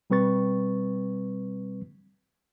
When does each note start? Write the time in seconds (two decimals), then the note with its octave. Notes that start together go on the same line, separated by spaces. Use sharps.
0.10 B2 G3 C4 B4 C#6 A6